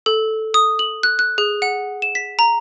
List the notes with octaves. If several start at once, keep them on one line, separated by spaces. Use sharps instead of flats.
A4
D#6
F#7
F#6
F#6
G#4
F#5
E7
B6
A#5